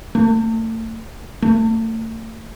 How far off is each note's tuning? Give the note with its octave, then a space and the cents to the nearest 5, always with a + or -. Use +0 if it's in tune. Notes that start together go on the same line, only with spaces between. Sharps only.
A3 +35
A3 +35